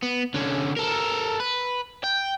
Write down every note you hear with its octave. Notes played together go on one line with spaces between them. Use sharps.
B3
D3 C#4
A4 A#4
B4
G5